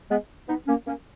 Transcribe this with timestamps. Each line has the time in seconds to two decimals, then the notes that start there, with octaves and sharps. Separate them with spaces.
0.10 G#3 B3
0.48 B3 D#4
0.67 A#3 C#4
0.87 A#3 C#4